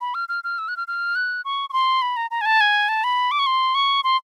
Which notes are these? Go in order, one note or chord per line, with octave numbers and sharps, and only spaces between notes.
B5
F6
F6
F6
E6
F#6
F6
F6
F#6
C#6
C#6
C6
B5
A#5
A#5
G#5
A5
G#5
A5
B5
D6
C#6
C6
C#6
C6